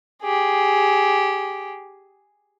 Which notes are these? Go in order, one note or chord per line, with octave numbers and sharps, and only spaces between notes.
G4 G#4